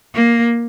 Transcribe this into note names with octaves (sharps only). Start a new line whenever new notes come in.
A#3